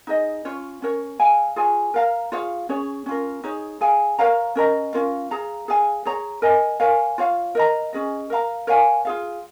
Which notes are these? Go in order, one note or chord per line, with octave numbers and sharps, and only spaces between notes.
D#4 G#4 D#5
C#4 F4 C#5
C#4 A#4 C#5
G#4 F5 G#5
F4 G#4 C#5 G#5
A#4 F5 A#5
F4 G#4 C#5 F5
C#4 G#4 C#5
C#4 F4 A#4
D#4 G#4 C#5
G#4 F5 G#5
A#4 C#5 F5 A#5
C#4 A#4 D#5 A#5
C#4 F4 A#4 F5
G#4 F5 A#5
G#4 F5 G#5
G#4 C#5 A#5
A#4 D#5 G#5
A#4 C#5 F5 G#5
F4 C#5 F5
A#4 D#5 A#5
C#4 G#4 D#5
A#4 F5 A#5
A#4 C#5 F5 G#5
F4 G#4 F5